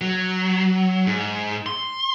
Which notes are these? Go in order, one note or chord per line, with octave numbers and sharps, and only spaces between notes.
F#3
G#2
C6